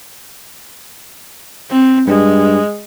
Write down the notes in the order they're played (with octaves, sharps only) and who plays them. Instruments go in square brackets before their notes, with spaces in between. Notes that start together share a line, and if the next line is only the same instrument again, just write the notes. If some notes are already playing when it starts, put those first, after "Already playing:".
[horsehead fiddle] C4
[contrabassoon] G2 [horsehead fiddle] G#3